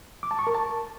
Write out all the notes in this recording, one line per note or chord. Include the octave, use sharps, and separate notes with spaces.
D6
A5
C#6
A#4
A5